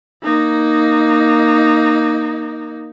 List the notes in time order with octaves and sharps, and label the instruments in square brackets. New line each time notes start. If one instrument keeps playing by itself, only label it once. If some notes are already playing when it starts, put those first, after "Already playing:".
[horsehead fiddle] A#3 D#4